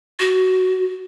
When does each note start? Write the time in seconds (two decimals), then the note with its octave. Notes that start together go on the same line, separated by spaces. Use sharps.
0.20 F#4